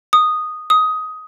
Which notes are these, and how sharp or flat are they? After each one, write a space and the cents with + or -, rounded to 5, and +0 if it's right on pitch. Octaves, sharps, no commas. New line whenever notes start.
D#6 -10
D#6 +15